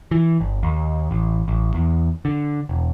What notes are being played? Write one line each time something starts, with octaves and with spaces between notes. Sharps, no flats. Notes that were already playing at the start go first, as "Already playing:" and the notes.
E3
G1
D#2
A1
A1
E2
D3
E1